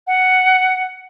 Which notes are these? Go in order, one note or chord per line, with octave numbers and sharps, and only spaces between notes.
F#5